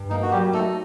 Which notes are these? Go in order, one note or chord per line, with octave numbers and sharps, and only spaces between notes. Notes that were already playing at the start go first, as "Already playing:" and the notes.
Already playing: G2
A#3 D#4
F#4
F#3 G3 G4
A3 D#4 A4